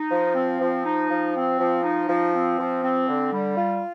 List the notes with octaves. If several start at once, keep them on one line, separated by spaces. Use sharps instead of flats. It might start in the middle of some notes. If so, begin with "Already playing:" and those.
Already playing: D#4
F3
C4
F3
D#4
F3
C4
F3
D#4
F3
C4
F3
C4
D3
G3
F4